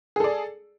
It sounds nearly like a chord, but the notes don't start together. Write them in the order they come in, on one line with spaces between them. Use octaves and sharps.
G#4 A4 D5